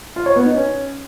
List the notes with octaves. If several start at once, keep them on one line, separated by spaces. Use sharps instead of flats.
F4
C#5
B3
D#4
C#4